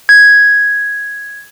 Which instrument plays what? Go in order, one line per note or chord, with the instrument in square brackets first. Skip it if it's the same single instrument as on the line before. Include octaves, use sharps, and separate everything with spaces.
[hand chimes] G#6